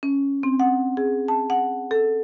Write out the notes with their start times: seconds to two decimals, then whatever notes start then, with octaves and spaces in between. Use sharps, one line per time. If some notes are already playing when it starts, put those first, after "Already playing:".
0.03 C#4
0.43 C4
0.60 F#5
0.97 G#4
1.28 A5
1.50 F#5
1.91 A4